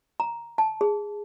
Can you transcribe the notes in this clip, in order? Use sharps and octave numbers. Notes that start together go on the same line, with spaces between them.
A#5
A5
G#4